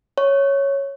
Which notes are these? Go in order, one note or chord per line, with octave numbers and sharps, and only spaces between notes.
C#5